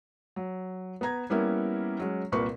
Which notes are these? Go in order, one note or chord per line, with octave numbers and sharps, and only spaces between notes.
F#3
B3 B4 A#5 G#6
G3 A#3 B3 C#4 E4 A#4
F#3 G#3 C#4
C2 A#2 A#4 B4 C#6